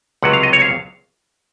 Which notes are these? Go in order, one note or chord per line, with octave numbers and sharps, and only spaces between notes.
C#2 C3 F#3 F#5
F5
D#5
C#5
F5